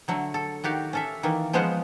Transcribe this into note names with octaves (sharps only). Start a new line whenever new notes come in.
D3 F#3 A3
A4
D#3 F#4 G4 F5
C#4 A4 E5
D#3 E3 A#3
F3 G#3 B3 C#4 C5 F#5